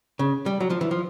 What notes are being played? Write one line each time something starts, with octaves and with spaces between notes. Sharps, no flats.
C#3
G3
F#3
F3
E3
F3